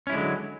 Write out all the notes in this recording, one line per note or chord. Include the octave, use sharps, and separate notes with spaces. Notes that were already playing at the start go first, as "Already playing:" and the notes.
D3 F#3 G#3 C#4 E4